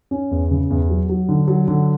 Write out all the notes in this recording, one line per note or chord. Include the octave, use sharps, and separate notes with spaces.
C#4
E2
C#3
E2
F#3
F#3
D3
F#3
D3